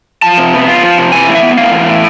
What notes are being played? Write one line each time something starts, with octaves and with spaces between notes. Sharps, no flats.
F3 A5
C3
B3
F4
F3
C3
E3 G#5
A2
E5
B3
A2 F5
E3
A2